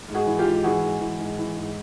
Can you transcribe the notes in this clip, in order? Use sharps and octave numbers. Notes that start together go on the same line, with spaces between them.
G#2
F#4 G#4
E3
F4 G4
G#2
E3 F#4 G#4
G#2
E3
G#2
E3
G#2